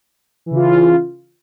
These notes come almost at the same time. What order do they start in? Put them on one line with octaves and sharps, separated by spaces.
E3 C#3 F4